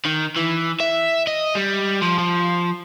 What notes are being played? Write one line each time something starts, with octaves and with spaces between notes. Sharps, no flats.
D#3
E3
E5
D#5
G3
F3
F3